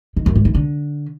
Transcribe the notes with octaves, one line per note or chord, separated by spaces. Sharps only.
D#3
F#2
G#2
E3
D3